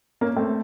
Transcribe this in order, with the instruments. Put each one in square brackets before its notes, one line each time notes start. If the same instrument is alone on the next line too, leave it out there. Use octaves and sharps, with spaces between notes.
[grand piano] A#3 C#4
A3 C4